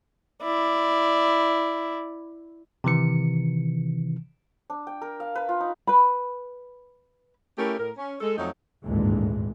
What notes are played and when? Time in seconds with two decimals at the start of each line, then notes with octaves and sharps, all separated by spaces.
0.42 E4 D5
2.84 C3 D#3 E3 C#7
4.70 D4
4.87 G5
5.02 A#4
5.20 F5
5.35 B4
5.49 F4
5.60 D#4
5.87 B4 B5
7.58 A3 C#4 E4 G4 A4 A#4
7.78 A2 A#4
7.97 C#4
8.20 G#3 A4
8.37 F2 F#3 A3 D#4
8.84 G#1 D2 G2 A#2 E3 G#3